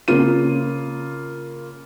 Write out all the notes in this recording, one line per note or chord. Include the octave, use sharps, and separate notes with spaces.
C#3 A#3 F4 D#7